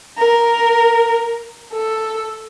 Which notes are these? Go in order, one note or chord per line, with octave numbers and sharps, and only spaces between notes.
A#4
A4